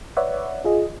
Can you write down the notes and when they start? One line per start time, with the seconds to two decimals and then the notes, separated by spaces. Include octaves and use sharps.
0.17 B4 C#5 D5 E5 F#5
0.65 F4 G#4 D#5